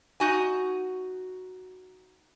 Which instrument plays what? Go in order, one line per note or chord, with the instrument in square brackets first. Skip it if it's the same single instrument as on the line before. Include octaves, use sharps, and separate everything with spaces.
[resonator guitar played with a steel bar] D#4 F#4 G#5